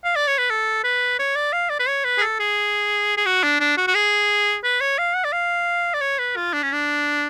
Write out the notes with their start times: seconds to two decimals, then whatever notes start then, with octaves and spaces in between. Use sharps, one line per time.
0.04 F5
0.15 D5
0.27 C#5
0.38 B4
0.50 A4
0.84 B4
1.19 C#5
1.35 D5
1.52 F5
1.70 D5
1.79 B4
1.88 C#5
2.04 B4
2.18 G#4
2.21 A4
2.39 G#4
3.17 G#4
3.26 F#4
3.43 D4
3.60 D4
3.77 F#4
3.87 F#4
3.95 G#4
4.64 B4
4.81 C#5
4.98 F5
5.15 F#5
5.24 D5
5.32 F5
5.93 D5
6.01 C#5
6.18 B4
6.36 F4
6.53 D4
6.63 C#4
6.72 D4